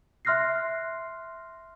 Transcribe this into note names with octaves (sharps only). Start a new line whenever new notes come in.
E5 C6 F6 F#6 A#6 C7